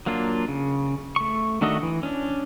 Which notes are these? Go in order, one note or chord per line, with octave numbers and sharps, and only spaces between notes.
F#3 A#3 D4 F4
C#3
A3 C#6
D#3 A3 D4 F#4 D#5
E3
C#4 D4